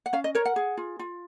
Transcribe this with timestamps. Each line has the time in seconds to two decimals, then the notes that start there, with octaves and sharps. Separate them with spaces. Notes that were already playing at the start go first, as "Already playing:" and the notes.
0.06 F#5
0.13 C#4 F5
0.24 D#5
0.35 A#4 C#5
0.45 F#5
0.56 G#4
0.77 F4
0.99 F4